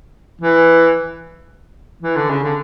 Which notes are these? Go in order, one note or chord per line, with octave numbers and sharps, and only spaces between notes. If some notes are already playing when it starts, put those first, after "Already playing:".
E3
E3
D3
C#3
D3